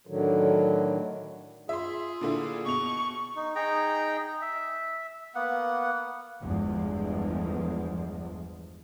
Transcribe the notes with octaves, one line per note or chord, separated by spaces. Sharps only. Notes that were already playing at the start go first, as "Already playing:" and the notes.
A2 D3 D#3 F#3
F4 G#4 E5 C6
A#2 D3 E4
B2 C#6 F7
D#4
D#4 G#4 G5 A#5
E5
A#3 B3 F#5
G1 E2 G2 F3 G#3